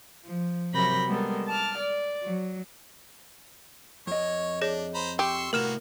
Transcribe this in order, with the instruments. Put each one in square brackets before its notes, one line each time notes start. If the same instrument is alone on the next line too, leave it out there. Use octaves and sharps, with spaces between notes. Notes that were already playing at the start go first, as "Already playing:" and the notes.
[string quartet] F3
C3 F#3 A#4 B5 G6 A#6
G3 G#3 B3 A4 A#4
A5 D6 F6
D5
F#3
[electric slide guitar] F2 D#5 [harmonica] C#5
[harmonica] D4 [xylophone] G#4 C#5 A#6
[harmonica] C5 A#5 B5
[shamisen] G4 [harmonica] C6 C#6 E6
[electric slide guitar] A2 C3 [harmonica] A#3 B3 F#4 [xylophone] A#4 F6 E7